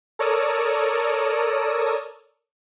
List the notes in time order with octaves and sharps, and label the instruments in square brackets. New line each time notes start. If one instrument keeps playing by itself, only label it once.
[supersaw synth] A4 A#4 C#5 D5 D#6 E6